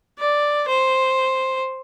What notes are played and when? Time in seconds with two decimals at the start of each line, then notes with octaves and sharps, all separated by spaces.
0.18 D5
0.68 C5